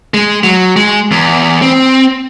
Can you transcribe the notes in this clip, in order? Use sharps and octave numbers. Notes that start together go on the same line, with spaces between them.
G#3
F#3
G#3
E2
C4